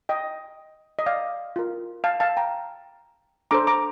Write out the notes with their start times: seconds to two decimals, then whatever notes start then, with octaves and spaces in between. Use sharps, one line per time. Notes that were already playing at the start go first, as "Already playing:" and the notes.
0.09 D#5 G5
0.99 D#5
1.06 D5 F5
1.56 F4 A#4
2.04 F5 A5
2.20 F5 A5
2.37 G5 A#5
3.51 D4 A4 C5 A#5 D6
3.67 A#5 D6